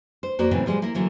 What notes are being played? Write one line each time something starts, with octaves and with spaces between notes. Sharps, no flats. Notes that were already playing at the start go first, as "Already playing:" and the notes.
C5
F2 A#3 F#4 C5 D5
A2 C#3 E3 F#3 G#3 C4
F3 G3 G#3
A#3 E4 A#4
D3 E3 F#3 A#3